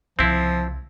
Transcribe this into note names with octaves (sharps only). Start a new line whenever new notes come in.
C2 C#3 F3 C4 E4